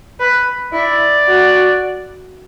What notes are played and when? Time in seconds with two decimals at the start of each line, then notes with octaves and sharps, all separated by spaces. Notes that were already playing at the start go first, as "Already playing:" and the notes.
0.20 B4
0.73 E4 D5
1.27 F#4